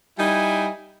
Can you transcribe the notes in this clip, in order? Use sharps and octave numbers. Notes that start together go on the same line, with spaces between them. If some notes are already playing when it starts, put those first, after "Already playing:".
G3 D#4 E4 G#5